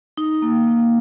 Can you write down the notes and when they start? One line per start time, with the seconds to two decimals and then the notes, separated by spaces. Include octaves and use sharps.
0.18 D#4
0.42 A#3
0.67 A#3